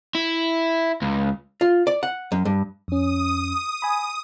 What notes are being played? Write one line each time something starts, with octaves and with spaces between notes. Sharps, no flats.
E4
C#2
F4
D5
F#5
F#2
G2
F2 C#4 D#6
G#5 B5